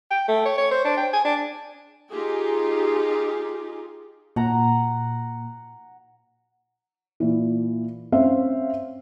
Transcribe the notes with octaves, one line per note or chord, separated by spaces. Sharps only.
G5
A3
C#5
C#5
C5
D4
G5
G#5
D4
D#4 F4 G4 G#4
A#2 F#5 A#5
A#2 E3
C4 C#4 C5 E5 F5